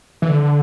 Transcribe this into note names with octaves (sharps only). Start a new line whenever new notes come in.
E3
D3